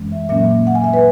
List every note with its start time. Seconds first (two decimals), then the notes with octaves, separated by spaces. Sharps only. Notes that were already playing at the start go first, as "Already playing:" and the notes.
Already playing: F#2 E3 G#3 C#4
0.12 E5
0.29 A#2 F#3 A#3 C#4 E5
0.67 F#5
0.75 G#5
0.84 E5
0.94 B4